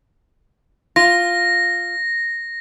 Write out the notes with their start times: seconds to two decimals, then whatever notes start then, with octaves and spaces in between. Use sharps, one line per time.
0.96 F4 A#6